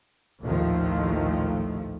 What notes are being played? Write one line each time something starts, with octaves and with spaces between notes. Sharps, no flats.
A#1 D#2 A2 D#3 F3 A3